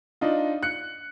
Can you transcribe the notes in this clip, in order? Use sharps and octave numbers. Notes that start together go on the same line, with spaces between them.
D4 D#4 F4
F#6 C#7